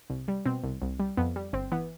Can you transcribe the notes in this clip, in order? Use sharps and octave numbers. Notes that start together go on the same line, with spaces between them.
C2
G3
B2 C4
C2
C2
G3
F2 B3
G3
G1 C4
E3 B3